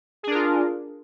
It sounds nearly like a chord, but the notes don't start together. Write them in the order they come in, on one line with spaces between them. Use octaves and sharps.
G#4 D4 A#4 F4